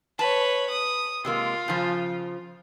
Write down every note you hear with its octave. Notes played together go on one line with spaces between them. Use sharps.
B4 C#5 A5
D#6
C3 G#3 A#3 F4
C#3 F3